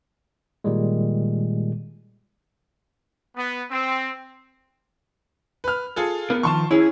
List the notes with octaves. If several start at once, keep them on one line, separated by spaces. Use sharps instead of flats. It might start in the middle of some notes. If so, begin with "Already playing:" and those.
A#2 D#3 G3 G#3
B3
C4
B4 F6
F4 G#4 A4
B3 A#4
D#3 F3 A5 C6 C#6
C#4 E4 G#4